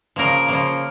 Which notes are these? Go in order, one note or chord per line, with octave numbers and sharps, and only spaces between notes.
C#3 F3 A#3 A#4
C#3 F3 A#3